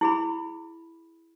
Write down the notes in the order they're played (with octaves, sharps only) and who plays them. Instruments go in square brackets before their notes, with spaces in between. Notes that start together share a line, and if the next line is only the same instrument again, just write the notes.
[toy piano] E4 G#4 B5